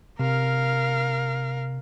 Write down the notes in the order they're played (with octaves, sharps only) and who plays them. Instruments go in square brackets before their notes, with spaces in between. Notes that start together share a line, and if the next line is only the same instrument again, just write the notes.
[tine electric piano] C3 [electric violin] A#4 F5